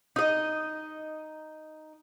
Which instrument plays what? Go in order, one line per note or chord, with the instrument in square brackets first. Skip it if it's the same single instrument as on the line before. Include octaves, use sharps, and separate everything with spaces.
[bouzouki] D#4 D#5